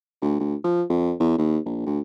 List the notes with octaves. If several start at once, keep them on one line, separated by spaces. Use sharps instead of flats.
D2
D2
F3
F2
E2
D#2
A#1
D2